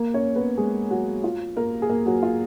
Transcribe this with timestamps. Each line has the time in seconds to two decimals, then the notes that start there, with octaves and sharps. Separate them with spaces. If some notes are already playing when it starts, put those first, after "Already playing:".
Already playing: A#3 A#4
0.14 C#4 C#5
0.36 B3 B4
0.57 G#3 G#4
0.91 F#3 F#4
1.24 F4
1.56 A#3 A#4
1.82 G#4
1.89 A#3 A#4
2.06 F#3 F#4
2.23 F4